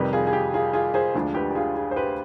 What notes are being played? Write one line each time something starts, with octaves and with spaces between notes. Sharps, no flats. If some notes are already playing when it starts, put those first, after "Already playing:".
Already playing: F2 C3 D#3 G3 G4 B4
F4 G#4
G#4
G4
F4 G#4
F4 G#4
G#4 C5
D2 D3 F3 G#3 D4
G4 B4
G4
F4 G#4
F4 G#4
C5
G4 B4